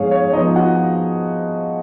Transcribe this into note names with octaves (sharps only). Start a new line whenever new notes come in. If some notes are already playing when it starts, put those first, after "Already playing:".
Already playing: G#2 F3 B3 G#4 C#5 F5
C#5
C#5
F3 B3 D#4 D#5
F#4 F#5